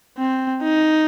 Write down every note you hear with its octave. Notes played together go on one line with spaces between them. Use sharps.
C4
D#4